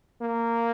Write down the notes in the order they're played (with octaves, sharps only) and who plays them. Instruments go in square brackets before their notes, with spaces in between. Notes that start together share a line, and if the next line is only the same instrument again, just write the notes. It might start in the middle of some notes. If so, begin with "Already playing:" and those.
[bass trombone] A#3